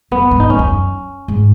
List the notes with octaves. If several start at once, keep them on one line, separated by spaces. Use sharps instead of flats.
F#2 B3
G#2
D#4
F#2 C#4
E2
F#2
G#2